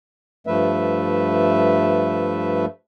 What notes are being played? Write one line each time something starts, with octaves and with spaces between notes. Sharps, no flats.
G2 F3 A3 B4 E5